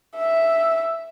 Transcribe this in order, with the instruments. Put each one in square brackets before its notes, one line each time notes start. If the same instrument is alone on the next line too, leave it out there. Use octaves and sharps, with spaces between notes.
[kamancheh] E5